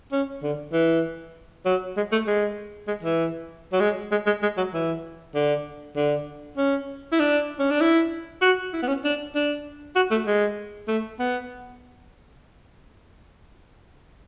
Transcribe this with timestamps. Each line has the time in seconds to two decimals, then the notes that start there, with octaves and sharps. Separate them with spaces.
0.12 C#4
0.43 D3
0.73 E3
1.66 F#3
1.97 G#3
2.12 A3
2.27 G#3
2.88 G#3
3.03 E3
3.73 F#3
3.80 G#3
4.12 G#3
4.27 G#3
4.43 G#3
4.57 F#3
4.74 E3
5.35 D3
5.97 D3
6.57 C#4
7.12 E4
7.20 D4
7.59 C#4
7.70 D4
7.81 E4
8.42 F#4
8.73 E4
8.82 B3
8.88 C#4
9.05 D4
9.35 D4
9.96 F#4
10.11 A3
10.27 G#3
10.88 A3
11.19 B3